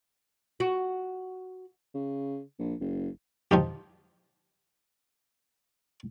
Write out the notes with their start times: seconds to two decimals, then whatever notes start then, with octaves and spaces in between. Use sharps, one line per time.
0.60 F#4
1.94 C#3
2.59 A#1
2.80 F#1
3.51 F3 D#4 G4